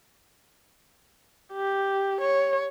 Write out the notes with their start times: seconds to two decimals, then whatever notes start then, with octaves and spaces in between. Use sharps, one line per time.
1.54 G4
2.22 C#5